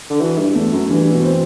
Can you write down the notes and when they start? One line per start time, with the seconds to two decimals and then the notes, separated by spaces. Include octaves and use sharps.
0.10 D3
0.20 E3 F#4
0.38 G2
0.55 E2 A3
0.72 F#2
0.89 G2 E3
1.12 B2
1.23 C4